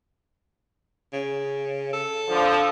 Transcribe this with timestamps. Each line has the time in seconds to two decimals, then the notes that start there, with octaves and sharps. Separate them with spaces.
1.13 C#3
1.93 A4
2.29 D3 F3